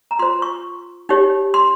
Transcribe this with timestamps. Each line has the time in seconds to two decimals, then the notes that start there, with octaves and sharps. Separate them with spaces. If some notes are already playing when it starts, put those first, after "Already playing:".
0.11 A#5
0.19 F4 C6
0.23 C5
0.42 C#6
1.09 D#4 G4 C#5
1.54 C6